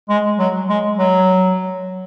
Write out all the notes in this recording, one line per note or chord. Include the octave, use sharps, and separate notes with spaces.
G#3
F#3
G#3
F#3